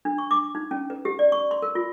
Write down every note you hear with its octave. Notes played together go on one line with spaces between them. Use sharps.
D4
C#6
D6
D#4
C#4
B4
G4
D5
C#6
C6
A#4
F4